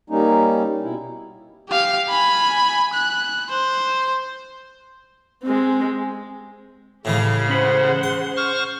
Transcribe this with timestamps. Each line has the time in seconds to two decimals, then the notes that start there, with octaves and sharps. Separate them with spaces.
0.10 G3 A#3 C#4 D#4
0.83 B2 E4
1.69 G4 F5
2.09 G#5 B5
2.93 F#6
3.49 C5
5.44 G#3 C4
7.05 A2 C#3 E3 G#3 G4 F5
7.49 C#4 G#4 C5 F#5 B5
8.03 C6
8.37 C5 C#6 F6